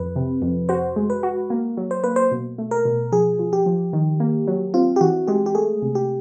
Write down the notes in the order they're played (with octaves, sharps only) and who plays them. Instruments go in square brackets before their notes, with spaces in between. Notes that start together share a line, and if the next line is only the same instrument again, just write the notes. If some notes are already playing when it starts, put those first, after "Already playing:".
Already playing: [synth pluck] F2 [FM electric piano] B4
[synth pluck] C3
F2
[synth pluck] F#4 [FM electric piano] C5
[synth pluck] G#3
[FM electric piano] B4
[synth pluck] F#4
A#3
F#3
[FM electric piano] C5
[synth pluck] A#3 [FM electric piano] B4
[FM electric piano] C5
[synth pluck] B2
A3
[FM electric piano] A#4
[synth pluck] B2
[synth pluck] F3 [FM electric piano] G#4
[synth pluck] F3
[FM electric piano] G4
[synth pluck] F3
D#3
A#3
F#3
[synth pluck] C4 [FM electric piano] F4
[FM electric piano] G4
[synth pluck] E3 [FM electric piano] F#4
[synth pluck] G#3 [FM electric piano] G4
[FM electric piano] G4
[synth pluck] A3 [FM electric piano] G#4
[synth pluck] C3
[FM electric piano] G4